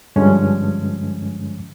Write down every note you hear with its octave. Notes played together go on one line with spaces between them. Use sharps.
G2 D3 F3 G#3 C#4